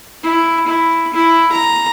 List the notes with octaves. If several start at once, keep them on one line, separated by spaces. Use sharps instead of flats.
E4
E4
E4
A#5